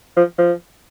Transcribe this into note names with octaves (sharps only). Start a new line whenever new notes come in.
F3
F3